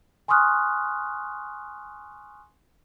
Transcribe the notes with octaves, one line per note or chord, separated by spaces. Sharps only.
G#5 C6 C#6 D#6 F6 F#6